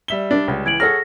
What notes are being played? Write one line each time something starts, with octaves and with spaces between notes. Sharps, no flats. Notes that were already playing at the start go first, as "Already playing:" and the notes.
G3 E5 G7
D4
C#2
E3 G#6 D7 F#7
G#4 A4 C#5 F#5 F6 A#6